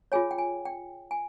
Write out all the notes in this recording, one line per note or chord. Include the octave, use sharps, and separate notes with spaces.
F4 G#4 C#5 G#5
G5
G#5
G5
G#5